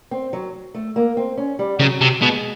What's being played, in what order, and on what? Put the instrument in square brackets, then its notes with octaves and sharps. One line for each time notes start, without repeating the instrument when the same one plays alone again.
[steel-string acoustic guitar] C4
F#3
A3
A#3
C4
C#4
G3
[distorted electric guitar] C#3 [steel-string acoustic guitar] F#3
[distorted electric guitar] C3
[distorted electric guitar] B2 [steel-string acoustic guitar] G#3